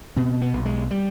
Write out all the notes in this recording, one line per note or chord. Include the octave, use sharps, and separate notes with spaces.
B2 C4
B3
B1
G#3
G3